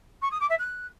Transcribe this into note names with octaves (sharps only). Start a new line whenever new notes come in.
C#6
D#6
D6
E5
F#6